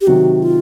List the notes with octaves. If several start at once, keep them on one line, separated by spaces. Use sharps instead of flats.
G4
C3 D#3 F#3 F#4
F4